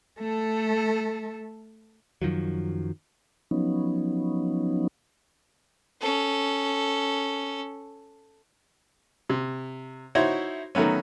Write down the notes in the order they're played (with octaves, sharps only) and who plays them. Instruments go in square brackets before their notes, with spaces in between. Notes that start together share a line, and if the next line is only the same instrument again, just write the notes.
[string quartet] A3 A4
[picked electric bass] F#2 D#3 F3 F#3
[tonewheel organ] F3 F#3 B3 C#4 D#4
[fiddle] C#4 A4
[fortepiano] C3
D#4 E4 F#4 C5 C#5
D#3 F#3 A3 B3 C#4